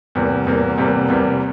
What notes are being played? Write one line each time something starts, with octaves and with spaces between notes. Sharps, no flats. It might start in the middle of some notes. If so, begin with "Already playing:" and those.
E2 C3 G3 A#3
E2 C3 G3 A#3
E2 C3 G3 A#3
E2 C3 G3 A#3